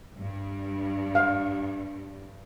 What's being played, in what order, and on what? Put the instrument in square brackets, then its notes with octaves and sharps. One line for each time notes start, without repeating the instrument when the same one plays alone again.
[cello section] G2
[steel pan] F5